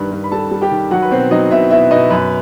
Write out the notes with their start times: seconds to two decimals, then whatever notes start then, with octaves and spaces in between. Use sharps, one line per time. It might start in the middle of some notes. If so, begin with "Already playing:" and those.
Already playing: G2 D#3 B4
0.11 G2
0.24 B5
0.31 G3 A4 A5
0.51 G3
0.61 G4 G5
0.71 D#3
0.91 F#3 F#4 F#5
1.02 B4
1.11 B2 C4 C5
1.31 F#3 D#4 D#5
1.51 B2 E4 E5
1.70 B2 E4 E5
1.91 B2 D#4 D#5
2.10 F#2 B4